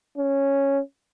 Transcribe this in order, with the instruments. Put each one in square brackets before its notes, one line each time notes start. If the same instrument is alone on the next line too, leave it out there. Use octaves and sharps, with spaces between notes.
[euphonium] C#4